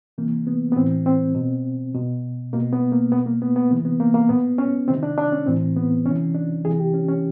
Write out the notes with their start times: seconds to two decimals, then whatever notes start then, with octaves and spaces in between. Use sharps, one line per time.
0.18 C3 E3 A#3
0.47 B3
0.72 B3
0.76 A2 E3 C4
1.06 C4
1.35 B2
1.94 B2
2.53 B2 A#3
2.72 B3
2.92 A#3
3.12 B2 B3
3.26 A#3
3.42 B3
3.56 B3
3.70 C3 E3 A#3
3.85 B3
4.00 A#3
4.14 A#3
4.29 A#2 B3
4.58 C#4
4.88 C3 D#3 C4
5.03 D4
5.18 D4
5.32 C#4
5.46 A2 E3 C4
5.76 B3
6.06 C3 C#4
6.10 E3
6.35 D4
6.65 C3 E3 G#4
6.79 G4
6.94 C#4
7.08 C#4